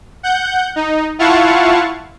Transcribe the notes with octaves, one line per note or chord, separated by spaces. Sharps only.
F#5 G6
D#4
E4 F4 F5 F#5 A5 C#6